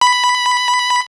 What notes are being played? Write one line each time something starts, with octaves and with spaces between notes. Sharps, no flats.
B5